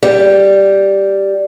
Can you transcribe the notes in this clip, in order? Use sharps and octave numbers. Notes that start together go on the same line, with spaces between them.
G3